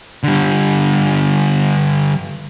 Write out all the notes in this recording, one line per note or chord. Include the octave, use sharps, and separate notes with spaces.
D3 G3